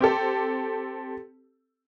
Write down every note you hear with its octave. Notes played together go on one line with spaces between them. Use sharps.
C4 G4 A4